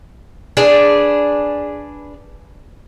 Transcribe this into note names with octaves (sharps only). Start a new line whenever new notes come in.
D4 G#4 B4